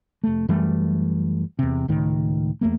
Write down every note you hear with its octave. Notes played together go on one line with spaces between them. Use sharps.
F1 A3
F#2 E3 G3 A3
E2 C3
C#2 A2 D#3
E2 A3 A#3